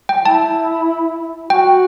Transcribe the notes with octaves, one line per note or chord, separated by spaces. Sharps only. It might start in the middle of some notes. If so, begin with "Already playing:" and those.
G5
E4 A5
F#4 G5